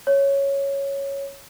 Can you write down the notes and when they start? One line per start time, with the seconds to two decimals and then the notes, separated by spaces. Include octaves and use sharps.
0.07 C#5